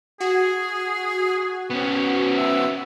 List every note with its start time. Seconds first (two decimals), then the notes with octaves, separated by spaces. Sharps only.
0.20 F#4 G#4
1.70 B3 C#4
2.37 E5